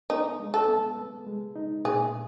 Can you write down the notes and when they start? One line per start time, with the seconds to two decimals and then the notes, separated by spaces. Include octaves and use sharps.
0.10 B3 D#4
0.39 G#3
0.54 A4
0.68 B3
0.97 B3
1.26 G#3
1.56 D#4
1.85 A#2 G#4